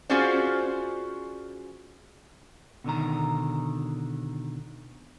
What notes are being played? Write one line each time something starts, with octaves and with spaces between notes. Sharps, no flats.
C#4 F4 F#4 G#4 C5 D5
B2 D3 D#3 A#5